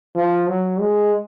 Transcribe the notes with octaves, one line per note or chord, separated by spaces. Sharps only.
F3
F#3
G#3